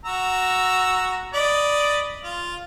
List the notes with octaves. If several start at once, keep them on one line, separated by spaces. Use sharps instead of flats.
F#4 A#5 E6
D5 D#5 B5
F4